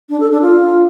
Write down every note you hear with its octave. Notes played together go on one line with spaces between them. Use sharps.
D4
A4
D4
F4